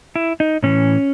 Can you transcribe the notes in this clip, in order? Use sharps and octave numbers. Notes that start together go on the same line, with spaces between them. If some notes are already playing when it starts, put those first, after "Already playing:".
E4
D#4
A2 E3 C#4